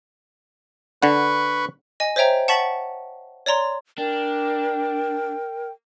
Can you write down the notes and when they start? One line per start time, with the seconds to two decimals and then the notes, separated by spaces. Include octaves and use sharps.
1.02 D3 B4 F#5 B5 C#6
2.00 D#5 G#5
2.16 C5 C#5 E5 G5 A#5
2.48 F#5 A5 C#6 A6 B6 F#7
3.46 C#5 D5 A#5 C6
3.98 D4 A#4 G5